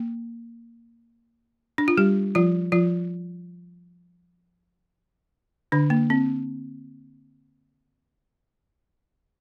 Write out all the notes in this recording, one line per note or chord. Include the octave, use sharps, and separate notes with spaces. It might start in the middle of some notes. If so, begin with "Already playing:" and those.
Already playing: A#3
D4
F4
G3 G4
F3 F4
F3 F4
D3 D4
A#3
C4